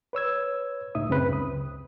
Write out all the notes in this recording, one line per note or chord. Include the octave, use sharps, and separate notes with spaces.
B4 C#5 E6 G#6
C#2 A2 D#4 E5 D#6
F#2 C#3 C4 B4
C#2 D#6